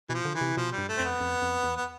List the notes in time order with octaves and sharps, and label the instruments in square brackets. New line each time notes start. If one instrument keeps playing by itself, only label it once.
[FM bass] B2 [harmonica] E3 F3
[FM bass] D3
[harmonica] E3
[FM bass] C3
[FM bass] B2 [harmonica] F3
[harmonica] G3
[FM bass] G2
[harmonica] A3
[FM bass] F2 [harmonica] C4
[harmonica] B3
[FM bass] F2
F2
E2
[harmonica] B3